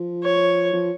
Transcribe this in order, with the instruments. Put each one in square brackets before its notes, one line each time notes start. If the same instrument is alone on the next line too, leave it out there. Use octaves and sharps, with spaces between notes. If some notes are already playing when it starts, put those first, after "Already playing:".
Already playing: [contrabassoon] F3
[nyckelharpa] C#5
[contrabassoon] F3